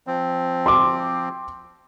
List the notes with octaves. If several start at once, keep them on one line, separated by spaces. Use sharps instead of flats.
F3 C4
C6 D6